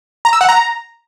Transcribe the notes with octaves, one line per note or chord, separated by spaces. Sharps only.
A#5
E6
F#5
A#5